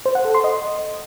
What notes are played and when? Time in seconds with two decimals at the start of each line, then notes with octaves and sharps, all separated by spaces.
0.06 C5
0.15 F#5
0.25 A4
0.35 C6
0.44 D#5